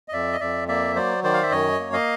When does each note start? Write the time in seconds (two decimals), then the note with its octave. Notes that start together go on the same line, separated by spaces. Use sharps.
0.08 D#5
0.12 F2 D5 E5
0.33 D#5
0.40 F2 D5 E5
0.68 A#3 D5 E5
0.96 F#3 C5 D5
1.24 D#3 C5 D5
1.34 F5
1.43 E5
1.51 F#2 C#5 D#5
1.79 A#3
1.93 D#5 F5